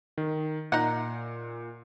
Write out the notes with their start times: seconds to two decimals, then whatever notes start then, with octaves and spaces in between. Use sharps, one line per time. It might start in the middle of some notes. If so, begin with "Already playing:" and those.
0.18 D#3
0.72 A#2 D#4 F#5